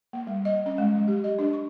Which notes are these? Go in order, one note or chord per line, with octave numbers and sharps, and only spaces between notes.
A#3
G3
D#5
C#4
G#3
F#3
G4
D#5
D4
C#6